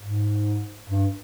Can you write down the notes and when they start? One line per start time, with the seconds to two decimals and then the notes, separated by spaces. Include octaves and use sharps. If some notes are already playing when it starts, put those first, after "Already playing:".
0.02 G#2
0.89 G2